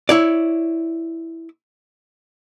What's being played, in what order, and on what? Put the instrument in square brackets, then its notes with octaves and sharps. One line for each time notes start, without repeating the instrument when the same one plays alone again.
[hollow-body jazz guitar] E4 C#5 D5